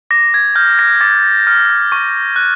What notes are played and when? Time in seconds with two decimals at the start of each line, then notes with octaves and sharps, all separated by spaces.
0.11 D6 A#6
0.34 G#6
0.56 F6 G6
0.79 A#6
1.01 D6 A6
1.47 F6
1.92 C#6
2.36 F#6